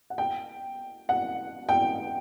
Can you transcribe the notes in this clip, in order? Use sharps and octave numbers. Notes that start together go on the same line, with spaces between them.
F#5
G5
F#5
G5